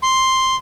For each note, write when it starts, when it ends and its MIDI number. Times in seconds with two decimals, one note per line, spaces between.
0.02 0.56 84